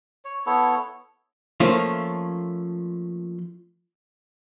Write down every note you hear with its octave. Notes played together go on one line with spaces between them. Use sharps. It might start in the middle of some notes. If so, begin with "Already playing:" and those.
C#5
B3 E4 A4 C#5
F3 A3 A#3 C#4 F4